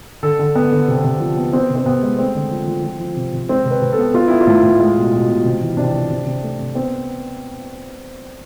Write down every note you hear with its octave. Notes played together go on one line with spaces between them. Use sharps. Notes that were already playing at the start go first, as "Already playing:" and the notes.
D3 A4
D3
B3
D3
C3
C3
F3
B3
B3 C4
C3
C4
C3 B3
G#3
A3 C4
D3
F3
F3
F3
F3
C3
C3
G#3 C4
C3
B4
C3
A4
B3
B3 F4
B3 E4
F4
A2
A2
G#3
B2
B2
B2
C3
E3
C3 D4
C3
C3
C3
A3
C3
B3 C4